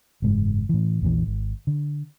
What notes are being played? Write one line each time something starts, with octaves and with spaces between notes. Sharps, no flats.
F#1 G#2 E3
A2 E3
A#1 E2 A#2 E3
G#1
D3